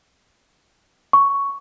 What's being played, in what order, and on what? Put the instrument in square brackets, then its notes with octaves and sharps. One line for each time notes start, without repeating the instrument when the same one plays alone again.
[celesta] C#6